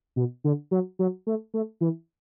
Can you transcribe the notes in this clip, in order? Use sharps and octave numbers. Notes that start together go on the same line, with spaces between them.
B2
D3
F#3
F#3
A3
A3
E3